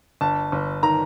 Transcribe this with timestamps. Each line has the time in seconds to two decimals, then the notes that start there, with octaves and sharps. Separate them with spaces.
0.21 G1 A5
0.52 G1
0.83 D#3 A#5